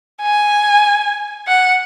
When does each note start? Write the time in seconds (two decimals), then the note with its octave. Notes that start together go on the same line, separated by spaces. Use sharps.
0.22 G#5
1.47 F#5